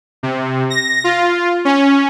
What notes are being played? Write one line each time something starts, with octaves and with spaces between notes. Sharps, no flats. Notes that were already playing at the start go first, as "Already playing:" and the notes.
C3
A#6
F4
C#4